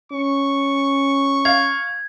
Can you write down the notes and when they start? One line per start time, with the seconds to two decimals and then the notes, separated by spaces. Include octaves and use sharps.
0.12 C#4 C#6
1.45 F5 G#6